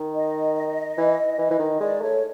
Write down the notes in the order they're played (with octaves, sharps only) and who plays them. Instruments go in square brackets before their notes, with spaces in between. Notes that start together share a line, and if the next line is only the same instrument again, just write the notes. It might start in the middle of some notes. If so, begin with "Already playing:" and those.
Already playing: [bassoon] D#3
[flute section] D#5
[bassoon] E3
E3
E3
D#3
[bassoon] G#3 [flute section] D5
[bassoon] A3 [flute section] C#5